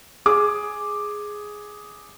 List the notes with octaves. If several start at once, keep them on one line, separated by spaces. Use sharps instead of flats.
G#4 D6